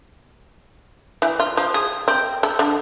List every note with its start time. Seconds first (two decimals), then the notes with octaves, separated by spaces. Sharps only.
1.22 E3
1.40 F4
1.57 F3
1.74 G#4
2.08 C4
2.43 A4
2.59 D3